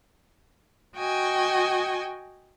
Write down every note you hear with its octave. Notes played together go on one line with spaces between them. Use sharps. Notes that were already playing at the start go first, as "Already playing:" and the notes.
F#4 D#5 G5 G#5